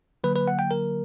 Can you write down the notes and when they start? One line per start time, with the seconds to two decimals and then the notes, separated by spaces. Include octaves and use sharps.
0.24 D3 F#3 A#3 B4
0.36 B4
0.48 F#5
0.59 G5
0.71 A#4